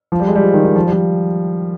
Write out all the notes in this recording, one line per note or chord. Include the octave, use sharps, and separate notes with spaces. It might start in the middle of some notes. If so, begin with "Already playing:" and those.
F3
G3
G#3
G3
F3
D#3
D#3
F3
G3
F3